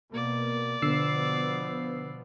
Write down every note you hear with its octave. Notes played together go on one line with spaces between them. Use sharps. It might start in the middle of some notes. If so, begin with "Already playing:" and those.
B2 A#3 D5
B2 D3 F3 B3 E6 C7